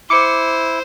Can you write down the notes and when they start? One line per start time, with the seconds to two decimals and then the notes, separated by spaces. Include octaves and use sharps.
0.10 E4 C5 D6 C#7